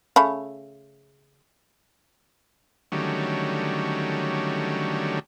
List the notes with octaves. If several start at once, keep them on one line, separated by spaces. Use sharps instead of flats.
C#3 A3 B5
D3 D#3 F#3 G3 A3 C#4